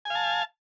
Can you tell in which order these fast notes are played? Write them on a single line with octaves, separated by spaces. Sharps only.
G#5 F5 A5